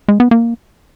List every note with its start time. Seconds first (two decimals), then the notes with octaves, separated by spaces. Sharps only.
0.08 G#3
0.20 B3
0.31 A#3